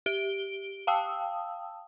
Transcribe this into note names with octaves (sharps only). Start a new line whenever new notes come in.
G4 D7 G7
F5 G5 A5 D#6 E6